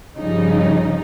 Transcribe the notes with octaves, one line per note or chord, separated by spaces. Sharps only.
G2 C#3 F3 G3 D#4